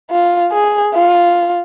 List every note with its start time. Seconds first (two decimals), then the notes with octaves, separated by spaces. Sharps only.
0.11 F4
0.52 G#4
0.95 F4